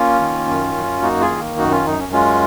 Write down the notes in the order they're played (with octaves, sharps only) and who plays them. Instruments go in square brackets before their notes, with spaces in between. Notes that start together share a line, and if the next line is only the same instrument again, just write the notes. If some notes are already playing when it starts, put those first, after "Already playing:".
Already playing: [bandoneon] A#3 C#4 F4
D#3
F#2
F#2
A#3 D#4 F#4
F4 G#4
D#3
F#2 D#4 F#4
C#4 F4
F#2 D#4
C#4
G#3 C#4 F4